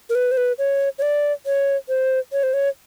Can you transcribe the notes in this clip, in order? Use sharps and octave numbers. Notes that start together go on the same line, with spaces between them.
A#4
B4
C5
B4
C#5
C#5
D5
C#5
C5
C#5
C5
C#5